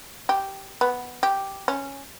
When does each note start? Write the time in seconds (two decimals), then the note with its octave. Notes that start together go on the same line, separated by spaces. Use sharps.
0.29 G4
0.81 B3
1.23 G4
1.68 C#4